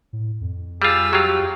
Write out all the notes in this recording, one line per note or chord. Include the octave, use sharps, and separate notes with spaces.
A2
F2
G3 F4 G#4 E6
F#3 F4 G4